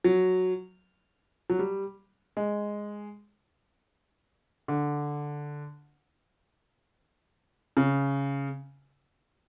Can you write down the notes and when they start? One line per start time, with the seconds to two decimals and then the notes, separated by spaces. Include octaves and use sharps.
0.04 F#3
1.50 F#3
1.59 G3
2.37 G#3
4.68 D3
7.77 C#3